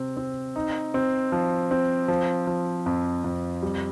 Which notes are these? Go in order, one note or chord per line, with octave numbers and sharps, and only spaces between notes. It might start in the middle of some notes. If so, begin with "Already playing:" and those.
Already playing: C3 C4
C4
D#4
C4
F3
C4
F3
F3
F2
F2
G3